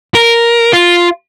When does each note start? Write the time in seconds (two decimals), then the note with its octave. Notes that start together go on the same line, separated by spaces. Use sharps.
0.15 A#4
0.73 F4